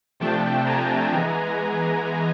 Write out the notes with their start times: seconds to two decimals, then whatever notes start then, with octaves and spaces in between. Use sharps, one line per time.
0.20 C3 F3 A3 D4 G5 A5
0.66 G#5 A#5
1.13 E3 G#3 B3